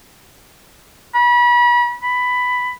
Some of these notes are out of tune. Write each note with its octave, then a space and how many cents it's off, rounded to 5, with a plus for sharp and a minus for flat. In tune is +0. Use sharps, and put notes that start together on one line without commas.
B5 -35
B5 +10